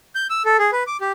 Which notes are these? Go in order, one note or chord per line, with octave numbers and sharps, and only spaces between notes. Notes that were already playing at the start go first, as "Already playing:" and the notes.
G6
E6
A4
G#4
B4
D6
G4